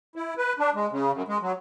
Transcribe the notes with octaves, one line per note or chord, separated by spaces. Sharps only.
E4
B4
D4
G#3
C#3
F#2
G#3
F#3